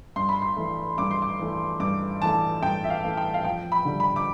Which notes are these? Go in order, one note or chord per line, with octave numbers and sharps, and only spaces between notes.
G2 C6
B5
C6
E3 A3
G2 D6
C6
D6
E3 A3
G2 D6
E3 A3 A5
G2 G5
E5
F5
E3 A3
G5
F5
F2 G5
B5
D3 G3
B5
D6